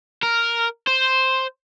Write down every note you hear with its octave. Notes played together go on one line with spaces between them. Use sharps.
A#4
C5